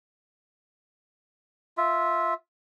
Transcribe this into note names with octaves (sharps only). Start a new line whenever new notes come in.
F4 E5